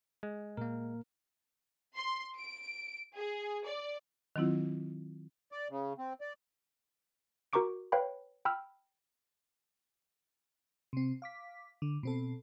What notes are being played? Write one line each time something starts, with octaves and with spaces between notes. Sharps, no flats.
G#3
A#2 A#3 A#4
C6
D7
G#4
D5
D#3 F#3 C4 E4 F4
D5
C#3
C4
D5
F#4 A#4 A#5 C#6 D6 D7
B4 C#5 F5 G5 B5
G5 B5 E6 F6
C3 C4
F5 D6 B6
D3
B2 C4 A4